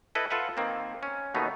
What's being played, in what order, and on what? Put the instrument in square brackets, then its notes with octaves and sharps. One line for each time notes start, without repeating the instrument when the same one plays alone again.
[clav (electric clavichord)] E4 A4 B4 D#5
F4 A4 B4 E5 F#5
D#3 A#3 C4
C#4
D#2 B2 A3 B3 D#4